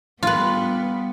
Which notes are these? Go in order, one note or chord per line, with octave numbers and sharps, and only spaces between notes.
G3 B3 F4 B4